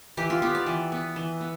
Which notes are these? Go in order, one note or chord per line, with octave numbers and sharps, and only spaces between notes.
E3 G4
F4
B3 G4
D5
E3
B3
E3
B3